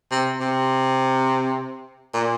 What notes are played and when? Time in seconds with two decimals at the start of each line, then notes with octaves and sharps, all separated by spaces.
0.11 C3
0.40 C3
2.14 A#2